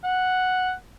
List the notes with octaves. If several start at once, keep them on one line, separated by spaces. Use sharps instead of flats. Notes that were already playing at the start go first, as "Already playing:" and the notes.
F#5